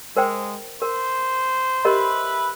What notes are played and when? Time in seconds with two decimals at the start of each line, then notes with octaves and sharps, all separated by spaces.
0.17 G#3 A#4 C5 G5
0.82 A#4 C5
1.85 G4 A#4 B4 D#5 E5 B5